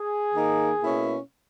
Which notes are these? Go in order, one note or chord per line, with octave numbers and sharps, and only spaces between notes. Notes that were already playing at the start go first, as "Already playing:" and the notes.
Already playing: G#4
D#3 A#3 D#4
B2 A#3 C#4 E4